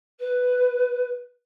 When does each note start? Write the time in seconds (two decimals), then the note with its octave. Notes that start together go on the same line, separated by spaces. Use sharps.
0.19 B4